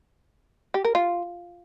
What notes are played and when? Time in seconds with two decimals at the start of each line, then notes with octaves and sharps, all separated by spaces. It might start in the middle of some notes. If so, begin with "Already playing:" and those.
0.74 G4
0.85 A#4
0.95 F4